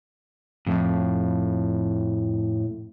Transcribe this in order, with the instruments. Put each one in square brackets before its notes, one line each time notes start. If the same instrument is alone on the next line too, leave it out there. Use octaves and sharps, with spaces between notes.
[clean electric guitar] F2 [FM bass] A2